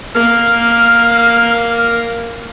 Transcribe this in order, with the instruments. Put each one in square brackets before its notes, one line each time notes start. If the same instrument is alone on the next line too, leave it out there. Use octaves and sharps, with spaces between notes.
[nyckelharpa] A#3 [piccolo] F6